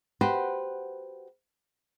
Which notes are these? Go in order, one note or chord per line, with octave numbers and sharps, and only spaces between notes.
F#4 G4 B4 C5